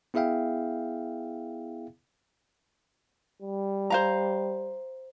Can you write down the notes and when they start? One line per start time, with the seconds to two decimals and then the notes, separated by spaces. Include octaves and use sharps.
0.14 B3 E4 G#4 E5 F5 G5
3.42 G3
3.90 C5 F5 A#5